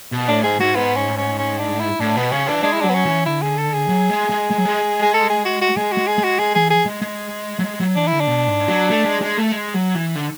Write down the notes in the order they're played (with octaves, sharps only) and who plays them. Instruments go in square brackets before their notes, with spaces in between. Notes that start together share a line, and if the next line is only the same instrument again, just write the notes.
[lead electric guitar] B2
[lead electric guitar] A2 [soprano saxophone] D4
[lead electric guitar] G#2 [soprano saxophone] G#4
[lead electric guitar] G#2 [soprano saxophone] F#4
[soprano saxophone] B3
C#4
C#4
C#4
D4
E4
[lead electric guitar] A2 [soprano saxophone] D4
[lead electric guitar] B2 [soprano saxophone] B3
[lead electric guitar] C#3 [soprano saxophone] C#4
[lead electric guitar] E3 [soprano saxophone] D4
[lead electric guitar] G#3 [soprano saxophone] D4
[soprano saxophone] E4
[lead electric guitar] F#3 [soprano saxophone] D4
[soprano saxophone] B3
C#4
[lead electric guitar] E3
[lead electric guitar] D3 [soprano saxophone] E4
[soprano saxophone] G#4
A4
G#4
[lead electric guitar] F#3
G#3
G#3
G#3
F#3
G#3
[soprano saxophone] G#4
A4
G#4
F#4
F#4
[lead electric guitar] G#3 [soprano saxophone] G#4
[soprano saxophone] F#4
[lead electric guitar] G#3
[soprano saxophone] G#4
[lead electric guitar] G#3
[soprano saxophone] F#4
[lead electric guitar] G#3 [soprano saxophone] G#4
[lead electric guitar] E3 [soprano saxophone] G#4
[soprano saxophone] G#4
[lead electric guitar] G#3
G#3
F#3
G#3
F#3
[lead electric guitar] E3 [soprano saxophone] D4
[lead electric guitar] D3 [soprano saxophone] E4
[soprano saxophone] D4
[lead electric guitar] B2
G#2
F#3
A3
G#3
G#3
A3
G#3
F#3
E3
D3